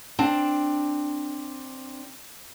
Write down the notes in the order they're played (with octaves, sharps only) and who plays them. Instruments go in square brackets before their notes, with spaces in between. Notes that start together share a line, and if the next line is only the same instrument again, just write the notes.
[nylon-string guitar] C4 D4 A5